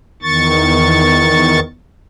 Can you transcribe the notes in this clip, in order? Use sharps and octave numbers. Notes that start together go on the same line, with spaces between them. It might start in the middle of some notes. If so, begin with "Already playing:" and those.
E2 D#3 C#6 A6